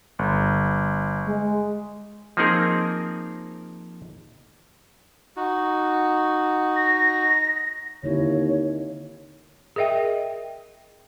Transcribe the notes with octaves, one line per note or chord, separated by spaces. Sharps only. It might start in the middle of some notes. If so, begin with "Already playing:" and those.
G1
G#3
F3 A#3 C4 D#4 G#4 A#4
D#4 F#4
A#6
D#2 D3 C4 E4 C#5
G#4 A#4 D#5 E5 G5